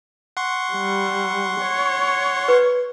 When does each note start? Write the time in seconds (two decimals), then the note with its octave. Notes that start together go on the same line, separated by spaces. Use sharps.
0.37 F#5 C6 C#6
0.73 G3
1.63 C#5
2.48 B4